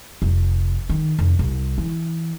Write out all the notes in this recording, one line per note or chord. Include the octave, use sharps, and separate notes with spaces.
F1
D#3
F1
C2
E3